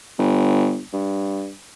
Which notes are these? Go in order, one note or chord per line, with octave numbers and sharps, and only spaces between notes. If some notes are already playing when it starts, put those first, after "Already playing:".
G1
G2